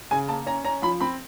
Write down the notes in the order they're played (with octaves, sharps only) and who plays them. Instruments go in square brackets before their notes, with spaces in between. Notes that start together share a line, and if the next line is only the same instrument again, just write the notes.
[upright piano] C#3 G#5
A#3 A5
C#4 A#5
C#4 A#5
F3 B5
C4 B5